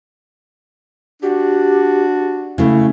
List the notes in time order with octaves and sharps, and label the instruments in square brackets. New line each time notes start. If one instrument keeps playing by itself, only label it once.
[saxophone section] D4 F#4 [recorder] G4
[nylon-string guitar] C#3 A3 [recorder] E4